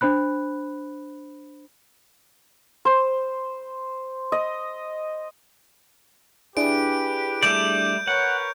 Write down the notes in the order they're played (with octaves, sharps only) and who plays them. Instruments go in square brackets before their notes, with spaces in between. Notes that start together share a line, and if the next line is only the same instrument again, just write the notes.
[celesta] D4 C5 B5 F#6
[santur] C5
D#5
[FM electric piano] D4 E4 G#4 [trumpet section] G4 B4 [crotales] D7
[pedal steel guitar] G3 A3 D5 [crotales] G6
[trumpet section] A#4 B4 C#5 [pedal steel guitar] F#5